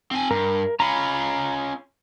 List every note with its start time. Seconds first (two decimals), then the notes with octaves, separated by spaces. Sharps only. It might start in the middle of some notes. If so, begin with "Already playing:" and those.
0.11 C4 G#5
0.31 G2 A#4
0.80 C#4 F4 A#5 B5